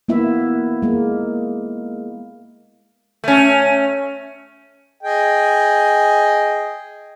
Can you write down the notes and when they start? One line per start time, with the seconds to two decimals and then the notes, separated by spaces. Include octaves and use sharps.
0.08 A#3 B3 E4 E5
0.82 G#3 A#3
3.24 A3 C#4
5.03 G#4 D#5 G5